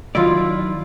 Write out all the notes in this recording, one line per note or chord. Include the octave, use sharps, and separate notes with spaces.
D#3 F#3 E4 F4 D5